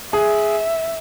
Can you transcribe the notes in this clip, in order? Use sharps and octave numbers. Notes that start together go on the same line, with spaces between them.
G#4 E5